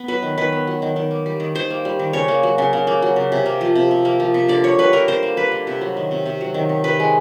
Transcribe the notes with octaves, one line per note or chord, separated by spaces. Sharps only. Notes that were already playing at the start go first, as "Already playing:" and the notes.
Already playing: B3
F#3 B4
D#3
D#3 B4
B3
F#3
D#3
D#3
A#3
G3
D#3
D#3 C5
A#3
G3
D#3
C#3 C#5
A#3
F#3
C#3
C#3
A#3
F#3
C#3
C3
A#3
F3
C3
C3
A#3
F3
C3
D3 D5
A#3 C#5
G3 B4
D3 A#4
D3 C5
A#3
G3 B4
D3
C3
F#3
D#3
C3
C3
F#3
D#3
C3
C3 B4
G#3